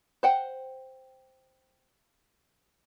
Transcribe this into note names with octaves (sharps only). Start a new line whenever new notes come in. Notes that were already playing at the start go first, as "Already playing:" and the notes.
C5 F#5 G5